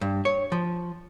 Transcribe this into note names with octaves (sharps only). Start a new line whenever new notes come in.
G2
C#5
F3